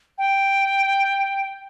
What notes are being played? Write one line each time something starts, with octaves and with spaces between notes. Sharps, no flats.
G5